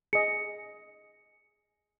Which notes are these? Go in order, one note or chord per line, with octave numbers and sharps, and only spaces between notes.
G#4 D#5 C#7